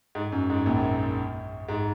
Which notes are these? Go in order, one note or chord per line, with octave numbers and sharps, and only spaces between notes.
G#2
F#2
G#2
A#1 A#2
G#2